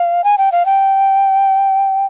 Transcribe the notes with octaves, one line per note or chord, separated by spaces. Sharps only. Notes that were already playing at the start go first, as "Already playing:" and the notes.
Already playing: F5
G#5
G5
F5
G5